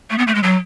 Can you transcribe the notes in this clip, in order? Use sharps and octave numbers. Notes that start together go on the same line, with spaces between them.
A3
B3
A3
G#3
F#3